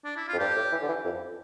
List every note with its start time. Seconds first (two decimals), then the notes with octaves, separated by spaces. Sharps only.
0.05 D4
0.17 E4
0.28 F4
0.33 F2
0.39 G2 G4
0.56 A2
0.72 E3
0.82 D3
0.89 E3
1.05 F2